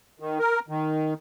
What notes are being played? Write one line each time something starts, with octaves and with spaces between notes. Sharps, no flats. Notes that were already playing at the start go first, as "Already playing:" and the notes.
D#3
A#4
D#3